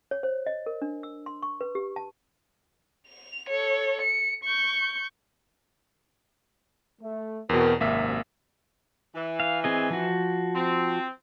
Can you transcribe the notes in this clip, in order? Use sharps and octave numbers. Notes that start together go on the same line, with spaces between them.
C#5
C5
D#5
A#4
D4
E6
C6
C#6
B4
G4
A5
F7
A4 C#5
C#7
C#6 G6
A3
E2 B2 C4 F#4 A#4
G#1 F#2 C3 A#3 E5
E3
F5
C4 G#4 D#5
F3 F#4
C4